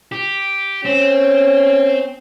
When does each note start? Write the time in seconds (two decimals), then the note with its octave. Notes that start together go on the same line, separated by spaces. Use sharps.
0.12 G4
0.85 C4 C#4